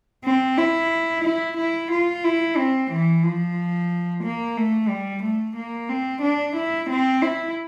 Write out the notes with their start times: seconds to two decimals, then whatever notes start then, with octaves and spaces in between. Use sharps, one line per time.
0.24 C4
0.57 E4
1.24 E4
1.57 E4
1.91 F4
2.24 E4
2.57 C4
2.91 E3
3.23 F3
4.23 A#3
4.57 A3
4.89 G3
5.23 A3
5.56 A#3
5.89 C4
6.22 D4
6.55 E4
6.89 C4
7.22 E4